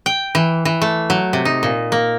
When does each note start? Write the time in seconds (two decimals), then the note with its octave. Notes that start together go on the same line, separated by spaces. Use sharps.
0.06 G5
0.35 E3
0.65 E3
0.81 A3
1.10 F#3
1.33 C3
1.45 D#4
1.63 A#2
1.92 A#3